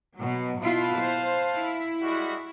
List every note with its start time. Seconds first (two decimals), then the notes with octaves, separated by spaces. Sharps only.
0.18 B2 F#3
0.60 B2 E4 F4 B4 F5 A5
1.00 C5
1.57 E4
2.02 G3 G#3 F#4